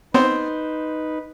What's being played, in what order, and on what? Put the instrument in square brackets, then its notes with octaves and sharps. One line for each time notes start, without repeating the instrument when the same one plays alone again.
[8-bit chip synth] B3 C4 [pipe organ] D#4 B4 [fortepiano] C5